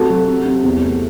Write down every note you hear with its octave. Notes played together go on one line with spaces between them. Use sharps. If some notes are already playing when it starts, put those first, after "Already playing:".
Already playing: C3 A3 F#4 A4
F#3
C3
C3
E2
A3